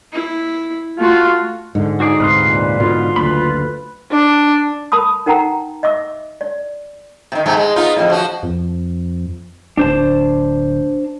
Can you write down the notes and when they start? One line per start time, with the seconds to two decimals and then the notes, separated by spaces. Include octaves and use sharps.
0.13 E4
0.98 A3 F4 F#4
1.75 G#2 D3
2.00 D#4 F#4 G#4 D5
2.20 D2 G#2 C3 B4 F5 C6
2.37 A#2
2.80 G#2 B2 D3 F4
3.16 F#1 D2 B4 B5
4.11 D4
4.92 A#4 A5 B5 D#6
5.26 D#4 A#4 F#5 G5 A5 A#5
5.83 D#5 E5 D6 E6
6.41 D5
7.32 C3 D#3
7.46 G#2 C3 A3
7.57 G#3
7.76 B3 D#4 F4
7.96 F2 A2
8.10 F3 F#4
8.43 F2
9.77 D1 D4 C5 A5